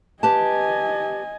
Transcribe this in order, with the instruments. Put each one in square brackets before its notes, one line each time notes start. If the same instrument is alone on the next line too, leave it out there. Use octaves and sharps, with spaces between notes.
[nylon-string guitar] G4 B4 A5 [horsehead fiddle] D#5 G#5